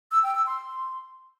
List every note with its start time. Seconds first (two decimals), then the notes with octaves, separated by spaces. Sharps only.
0.12 E6
0.23 G5
0.35 E6
0.47 C6